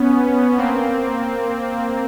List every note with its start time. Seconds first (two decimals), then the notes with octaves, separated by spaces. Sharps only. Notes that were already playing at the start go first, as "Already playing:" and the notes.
Already playing: B3 C#4
0.58 A#3 C4